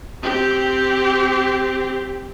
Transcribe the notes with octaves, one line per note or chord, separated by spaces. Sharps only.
C4 G4